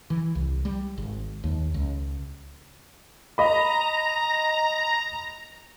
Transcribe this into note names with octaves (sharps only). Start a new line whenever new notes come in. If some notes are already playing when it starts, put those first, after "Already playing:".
E3
C2
G3
G#1
D#2
C#2
D#5 A#5 B5